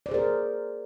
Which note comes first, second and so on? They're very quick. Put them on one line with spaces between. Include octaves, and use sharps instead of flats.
D5 C5 G#4 A#4